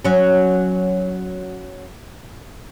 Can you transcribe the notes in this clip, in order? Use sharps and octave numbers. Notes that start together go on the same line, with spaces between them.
F#3 C#4